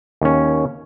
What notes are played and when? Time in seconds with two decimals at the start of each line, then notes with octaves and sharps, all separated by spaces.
0.21 D#2 C#4